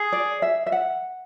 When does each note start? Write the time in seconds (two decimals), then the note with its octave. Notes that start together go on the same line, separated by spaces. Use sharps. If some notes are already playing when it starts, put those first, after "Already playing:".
Already playing: G#4
0.12 D5
0.42 E5
0.66 E5
0.72 F#5